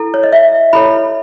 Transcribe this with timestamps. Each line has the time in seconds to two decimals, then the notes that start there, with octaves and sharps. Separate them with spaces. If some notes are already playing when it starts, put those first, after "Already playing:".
Already playing: E4 A4
0.14 C#5
0.23 D#5
0.32 E5
0.73 E4 A4 C#5 B5